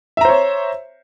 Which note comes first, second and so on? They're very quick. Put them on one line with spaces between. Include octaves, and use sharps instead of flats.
E5 A#5 C5 C#5